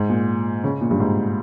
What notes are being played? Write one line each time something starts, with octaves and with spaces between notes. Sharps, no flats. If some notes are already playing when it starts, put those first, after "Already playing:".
Already playing: G#2
A#2
C#3
A#2
G2
G#2